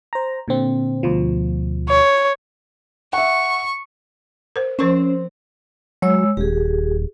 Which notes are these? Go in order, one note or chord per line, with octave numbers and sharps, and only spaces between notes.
C5 A#5
A#2 D3 C4
D2 B2 F3
C#5
E5 F#5 C#6
A#4 C5
F3 C4 C#4 A#4 C5 C#6
F#3 G#3 C#5 E6
D#1 G4 G#4